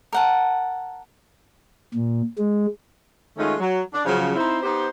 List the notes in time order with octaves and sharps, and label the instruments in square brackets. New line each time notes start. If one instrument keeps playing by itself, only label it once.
[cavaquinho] A#4 F#5 A5
[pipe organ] A#2
G#3
[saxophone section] D#3 G#3 A3 C#4 D#4 F4
F#3
D4
C#3 F3 F#3
C4 D#4 E4 C5
B3 D#4 G4 C5